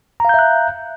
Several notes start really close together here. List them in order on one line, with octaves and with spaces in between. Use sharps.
A#5 F5 G6 E5 F#6